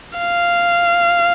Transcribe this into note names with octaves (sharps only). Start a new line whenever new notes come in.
F5